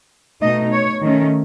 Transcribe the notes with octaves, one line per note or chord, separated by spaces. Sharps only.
B2 A3 D#4 D#5
C#5
D#3 A3 C#4